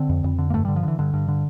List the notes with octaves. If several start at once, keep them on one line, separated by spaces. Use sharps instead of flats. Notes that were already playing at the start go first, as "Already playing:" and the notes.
Already playing: D3 C4
F2
F2
D3
A#3
G2 A3
D3 G3
F3
D3 E3
G2 D3
G2
D3